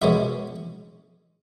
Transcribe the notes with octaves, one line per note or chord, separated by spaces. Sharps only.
B2 G#3 C#4 E5